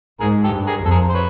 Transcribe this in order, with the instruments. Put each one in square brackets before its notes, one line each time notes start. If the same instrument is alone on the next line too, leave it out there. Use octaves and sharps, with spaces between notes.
[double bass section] G#2 [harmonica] G#4 A#4
[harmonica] G4 A4
[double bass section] G2
[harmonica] G#4 A#4
[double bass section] F2 [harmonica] A4
[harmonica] G#4 A#4
C5
B4 C#5